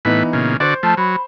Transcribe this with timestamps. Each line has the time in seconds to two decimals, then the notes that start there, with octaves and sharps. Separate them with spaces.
0.05 A2 E3 B3 D#4 B4
0.33 A#2 C#3
0.60 D3 F#4 C5 D5
0.83 F3 A3 A5
0.97 F#3 B5